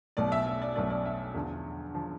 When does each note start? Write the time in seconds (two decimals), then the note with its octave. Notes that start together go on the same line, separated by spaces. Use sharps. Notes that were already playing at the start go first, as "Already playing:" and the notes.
0.17 B1 B2 A3 D5
0.32 E5
0.47 E5
0.62 D5
0.76 B1 B2 A3 D5
0.90 D5
1.06 E5
1.34 E2 D3 F3
1.94 D3 F3